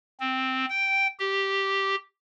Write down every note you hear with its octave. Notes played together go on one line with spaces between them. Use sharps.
C4
G5
G4